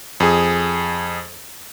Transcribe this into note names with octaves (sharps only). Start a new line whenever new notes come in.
F2 G#4